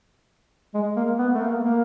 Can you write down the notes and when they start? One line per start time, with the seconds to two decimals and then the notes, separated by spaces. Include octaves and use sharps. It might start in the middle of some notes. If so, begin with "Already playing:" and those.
0.74 G#3
0.96 A#3
1.19 B3
1.35 A3
1.41 A#3
1.64 A#3